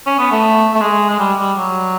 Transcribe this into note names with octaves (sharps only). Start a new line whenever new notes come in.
C#4
B3
A3
A3
G#3
G#3
G3
G3
F#3